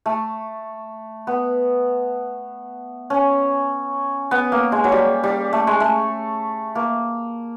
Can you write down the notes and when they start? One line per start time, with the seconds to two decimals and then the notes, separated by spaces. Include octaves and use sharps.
0.06 A3
1.27 B3
3.10 C#4
4.31 B3
4.52 A#3
4.72 G#3
4.84 F#3
4.92 G3
5.23 G3
5.53 A3
5.67 G#3
5.80 A3
6.75 A#3